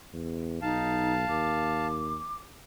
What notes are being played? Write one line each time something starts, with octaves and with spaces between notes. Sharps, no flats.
E2
B1 D#4 F5 A5
D#2 D6